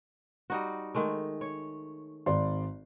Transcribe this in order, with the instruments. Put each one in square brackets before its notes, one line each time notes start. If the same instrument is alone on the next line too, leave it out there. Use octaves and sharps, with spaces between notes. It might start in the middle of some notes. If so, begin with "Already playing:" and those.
[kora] G3 D#4 F#4
D#3 G#3 A3
C#5
[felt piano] G#1 D5 C6